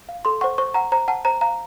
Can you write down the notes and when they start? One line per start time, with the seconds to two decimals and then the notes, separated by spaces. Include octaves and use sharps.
0.09 F5
0.25 A4 C6
0.41 C5 F#5 C#6
0.58 C5 C#6
0.74 F#5 A#5
0.92 C5 A#5
1.08 F#5 A5
1.25 C5 A#5
1.41 F5 A#5